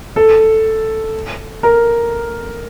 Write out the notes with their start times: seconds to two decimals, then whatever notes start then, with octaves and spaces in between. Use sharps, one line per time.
0.16 A4
1.63 A#4